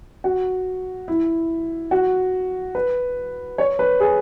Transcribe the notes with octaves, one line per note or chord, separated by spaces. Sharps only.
F#4
E4
F#4
B4
C#5
B4
G#4